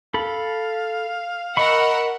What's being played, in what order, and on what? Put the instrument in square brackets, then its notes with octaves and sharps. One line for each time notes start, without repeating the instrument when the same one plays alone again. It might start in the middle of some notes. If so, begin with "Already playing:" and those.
[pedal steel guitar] A4 B5 [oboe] F5
[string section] A#4 F#5 E6 [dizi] D#5 [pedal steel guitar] B5 C#6